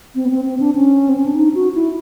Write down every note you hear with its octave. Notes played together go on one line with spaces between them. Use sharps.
C4
B3
C4
C4
D4
C#4
C4
C#4
D4
D#4
F#4
E4